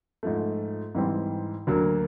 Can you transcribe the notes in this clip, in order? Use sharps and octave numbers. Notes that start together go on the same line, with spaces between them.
G#2 F3 A3
G#2 E3 G3 C4
D2 D3 F#3 A#3